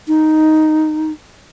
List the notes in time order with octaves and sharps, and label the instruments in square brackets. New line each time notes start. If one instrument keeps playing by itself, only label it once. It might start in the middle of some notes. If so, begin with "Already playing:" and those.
[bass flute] D#4